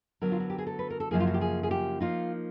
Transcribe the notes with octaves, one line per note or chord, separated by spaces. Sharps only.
D3 F#3 B3 A#4
F4
F#4
G4
G#4
A4
B4
A#4
A4
F#2 C#3 F3 A#3 G#4
F4
F#4
G4
G#4
G#4
G4
F3 A#3 D#4 F4